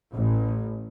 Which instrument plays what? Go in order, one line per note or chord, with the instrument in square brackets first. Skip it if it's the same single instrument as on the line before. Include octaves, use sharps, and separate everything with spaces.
[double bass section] A1